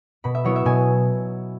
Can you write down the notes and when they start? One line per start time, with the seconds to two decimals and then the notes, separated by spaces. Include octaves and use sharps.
0.24 B2 B5
0.35 E5
0.44 F#3 B3 E4 C#5
0.56 E5
0.65 B2 G#5